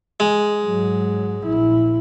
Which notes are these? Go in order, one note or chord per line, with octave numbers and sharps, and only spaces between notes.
G#3
G#2 F#3
A#1 E4